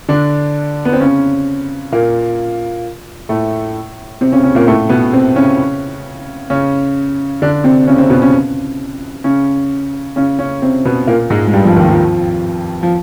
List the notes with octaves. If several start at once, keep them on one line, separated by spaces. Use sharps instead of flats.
D3 D4
B3
C4
C#3 C#4
A#2 A#3
A2 A3
C3 C4
C#3 C#4
C#3 C#4
A#2 A#3
A2 A3
B2 B3
C3 C4
C#3 C#4
C#3 C#4
D3 D4
C3 C4
C#3 C#4
C3 C4
B2 B3
C#3 C#4
C#3 C#4
C#3 C#4
C#3 C#4
C3 C4
B2 B3
A#2 A#3
G#2 G#3
G#3
G2 G3
F2 F3
D#2 D#3
F2 F3
F3